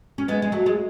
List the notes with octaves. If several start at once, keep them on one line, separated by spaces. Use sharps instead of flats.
C#4
G#3 B3
G#3
F#3 A3
G#3